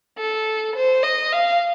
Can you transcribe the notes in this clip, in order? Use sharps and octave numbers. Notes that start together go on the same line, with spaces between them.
A4
C5
D#5
F5